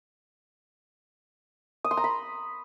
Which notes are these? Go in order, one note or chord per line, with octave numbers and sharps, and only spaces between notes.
D#6
C6
A#5
B5